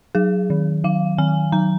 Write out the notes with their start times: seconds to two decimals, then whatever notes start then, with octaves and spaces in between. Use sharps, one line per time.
0.15 F#3 G#4
0.50 D#3
0.84 F#3 F5
1.18 D#3 G#5
1.52 F#3 A#5